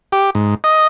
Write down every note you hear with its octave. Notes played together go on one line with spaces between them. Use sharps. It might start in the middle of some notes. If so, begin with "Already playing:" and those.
G4
G#2
D#5